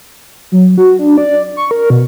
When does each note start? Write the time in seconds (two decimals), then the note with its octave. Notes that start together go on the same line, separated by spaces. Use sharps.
0.52 F#3
0.78 F#4
0.99 D4
1.18 D5
1.57 C#6
1.71 A#4
1.90 B2